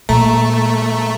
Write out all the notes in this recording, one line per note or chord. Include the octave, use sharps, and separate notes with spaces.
A#2 A3 A#5